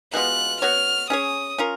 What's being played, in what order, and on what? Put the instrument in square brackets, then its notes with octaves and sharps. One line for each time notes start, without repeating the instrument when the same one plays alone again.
[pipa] B2 G#3 B3 F4 [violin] F#6
[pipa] B3 F#4 C#5 [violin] F6
[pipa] C#4 G#4 C#5 [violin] D#6
[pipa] C#4 F4 A#4